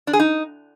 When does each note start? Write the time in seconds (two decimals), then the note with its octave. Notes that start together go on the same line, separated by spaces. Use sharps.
0.07 D4
0.13 G#4
0.19 D#4